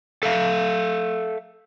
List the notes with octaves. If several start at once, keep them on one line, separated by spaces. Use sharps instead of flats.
A4 E5 F5